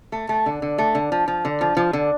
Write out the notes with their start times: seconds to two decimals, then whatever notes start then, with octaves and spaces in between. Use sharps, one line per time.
0.12 A3
0.29 A3
0.46 D3
0.62 D3
0.78 A3
0.95 D3
1.12 F3
1.28 F3
1.45 D3
1.61 F3
1.77 F3
1.93 D3